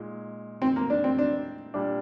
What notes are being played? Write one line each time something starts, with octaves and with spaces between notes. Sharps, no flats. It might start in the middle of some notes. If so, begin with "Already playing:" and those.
Already playing: A#2 G#3 D#4
C4
A#3
D4
C4
D4
A#2 G3 D4